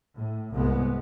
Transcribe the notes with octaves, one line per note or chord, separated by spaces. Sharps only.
A2
C2 G#2 G#3 B3